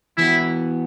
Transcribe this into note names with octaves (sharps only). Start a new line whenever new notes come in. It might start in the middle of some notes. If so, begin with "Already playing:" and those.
E3 B3 E4 F#4